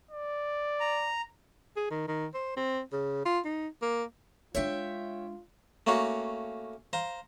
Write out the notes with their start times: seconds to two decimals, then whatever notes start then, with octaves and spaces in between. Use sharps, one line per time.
0.11 D5
0.80 A#5
1.77 G#4
1.91 D#3
2.08 D#3
2.34 C5
2.57 C4
2.92 C#3
3.25 F4
3.45 D#4
3.82 A#3
4.55 G#3 D4 F4 C#5 E5 G5
5.87 A3 A#3 C#4 F#4 F5
6.93 C5 F5 A#5